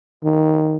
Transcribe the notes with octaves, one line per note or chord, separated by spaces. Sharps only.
D#3